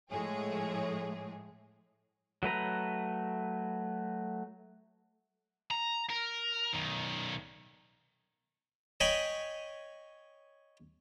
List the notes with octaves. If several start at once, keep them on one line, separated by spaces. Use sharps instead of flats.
A2 F3 G#3 A3 G#4 C#5
F#3 A3 B4 A#5
A#5
A#4
B1 D#3
C#5 D#5 G5 G#5 B5